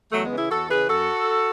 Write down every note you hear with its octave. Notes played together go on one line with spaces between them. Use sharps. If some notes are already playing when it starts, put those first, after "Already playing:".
E2 F#3 A3
G#3 B3
C#3 E3
E4 G#4
E2 F#4 A4
C#3 E3 G#4 B4
F#2 F#4 A4